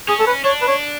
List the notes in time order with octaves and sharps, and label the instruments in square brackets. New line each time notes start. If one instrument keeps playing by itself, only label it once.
[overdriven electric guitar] C#4 [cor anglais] G#4
[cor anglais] A4
B4
[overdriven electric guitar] D4 [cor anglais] C#5
[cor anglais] B4
C#5